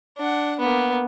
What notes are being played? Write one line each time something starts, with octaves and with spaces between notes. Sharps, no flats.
D4 F#5
A#3 B3